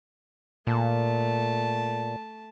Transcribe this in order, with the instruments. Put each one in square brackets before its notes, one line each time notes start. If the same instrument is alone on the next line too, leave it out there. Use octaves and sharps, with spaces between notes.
[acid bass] A#2 [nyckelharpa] A3 A5